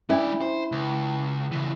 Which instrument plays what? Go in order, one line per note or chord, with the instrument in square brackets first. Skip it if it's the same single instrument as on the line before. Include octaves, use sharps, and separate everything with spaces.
[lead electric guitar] G#3 D5 [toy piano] C#4 D4 [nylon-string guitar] E4
[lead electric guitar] C5
C#2
C#3 E3